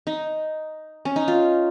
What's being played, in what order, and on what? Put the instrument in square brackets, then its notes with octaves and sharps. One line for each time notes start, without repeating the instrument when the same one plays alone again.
[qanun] D#4
C#4
D#4
F4